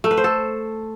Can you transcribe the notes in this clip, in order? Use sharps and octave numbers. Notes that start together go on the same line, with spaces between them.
A3
B4
C5
A4